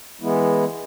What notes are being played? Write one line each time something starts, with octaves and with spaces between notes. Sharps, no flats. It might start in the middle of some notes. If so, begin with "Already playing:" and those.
E3 G#3 B3 E4